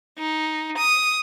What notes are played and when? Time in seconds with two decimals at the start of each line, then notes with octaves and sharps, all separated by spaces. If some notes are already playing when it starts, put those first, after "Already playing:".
0.18 D#4
0.77 D#6